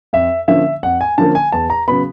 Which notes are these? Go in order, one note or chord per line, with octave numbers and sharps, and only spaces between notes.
F2 E5
D3 F3 A#3 C#4 E5
F2 F#5
G#5
D3 F3 A#3 C#4 A5
G#5
E2 A5
A#5
C#3 F#3 B3 B5